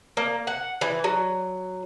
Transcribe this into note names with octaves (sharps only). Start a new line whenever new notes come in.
A#3
F#5
E3
F#3